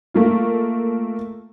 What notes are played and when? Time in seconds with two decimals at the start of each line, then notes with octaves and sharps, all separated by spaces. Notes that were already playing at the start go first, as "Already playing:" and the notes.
0.14 A3 A#3 F4